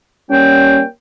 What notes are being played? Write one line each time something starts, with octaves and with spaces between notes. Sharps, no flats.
G3 A#3 C#4 G5